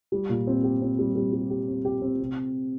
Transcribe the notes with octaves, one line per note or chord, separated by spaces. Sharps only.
G3
A#2
C4
G4
C4
G3
G3
G3
G4
C4
G4
C4
C3